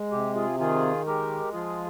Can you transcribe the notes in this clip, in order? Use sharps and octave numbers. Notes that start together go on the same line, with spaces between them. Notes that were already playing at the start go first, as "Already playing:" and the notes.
Already playing: G#3
C3 G4
F4 G#4
D#3 F4 G#4
G#3 G4 A#4
F3 F4 G#4